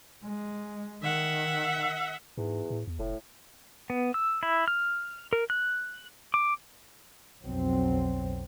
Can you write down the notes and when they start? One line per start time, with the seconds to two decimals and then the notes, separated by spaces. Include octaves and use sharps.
0.24 G#3
1.03 D#3 E5 F#5
2.37 E2 G#2
2.70 A2
2.87 E2
2.99 F1 A2
3.90 B3
4.14 E6
4.43 E4
4.68 F6
5.33 A#4
5.50 F#6
6.34 D6
7.43 B1 F2 F#3 C4